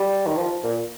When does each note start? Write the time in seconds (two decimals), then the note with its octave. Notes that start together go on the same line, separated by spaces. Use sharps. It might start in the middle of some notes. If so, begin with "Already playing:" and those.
Already playing: G3
0.27 D#3
0.37 F3
0.64 A#2